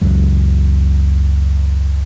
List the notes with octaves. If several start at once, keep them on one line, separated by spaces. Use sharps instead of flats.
C#2 F#2 F#3